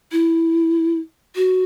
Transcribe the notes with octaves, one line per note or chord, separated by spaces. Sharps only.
E4
F#4